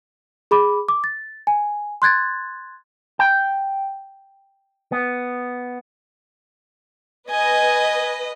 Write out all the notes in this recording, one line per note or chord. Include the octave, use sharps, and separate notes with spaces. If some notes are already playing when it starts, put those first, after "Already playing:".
G#4 B5 D6
D6
A6
G#5
C6 F#6 G#6 A6
G5
B3
B4 D#5 G#5